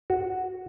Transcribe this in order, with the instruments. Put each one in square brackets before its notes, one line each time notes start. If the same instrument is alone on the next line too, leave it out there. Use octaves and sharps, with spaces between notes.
[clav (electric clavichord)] F#4